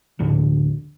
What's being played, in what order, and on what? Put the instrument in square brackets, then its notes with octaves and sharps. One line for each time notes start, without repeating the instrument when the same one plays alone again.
[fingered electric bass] F1 D2 A2 D3